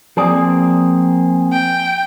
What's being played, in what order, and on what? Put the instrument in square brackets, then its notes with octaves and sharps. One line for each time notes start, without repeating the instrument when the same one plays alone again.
[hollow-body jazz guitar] F3 D5 [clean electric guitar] A#3 C4 G#4
[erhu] G5